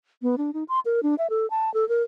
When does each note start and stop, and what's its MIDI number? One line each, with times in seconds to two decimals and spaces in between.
0.22 0.36 59
0.38 0.51 62
0.54 0.64 63
0.69 0.80 84
0.86 1.00 70
1.03 1.15 62
1.18 1.27 76
1.30 1.49 69
1.50 1.72 81
1.74 1.87 69
1.89 2.03 70